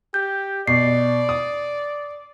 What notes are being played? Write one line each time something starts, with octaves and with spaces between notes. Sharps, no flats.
G4 G6
B2 D5 C7
D#6